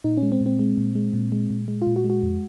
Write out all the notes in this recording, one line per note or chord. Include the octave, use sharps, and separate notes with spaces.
A#2 D#4
C#4
G#3
C4
A#2
C4
G#3
A#2
G#3
A#2
G#3
A#2
G#3
F4
A#2
F#4
G#3
F#4
F2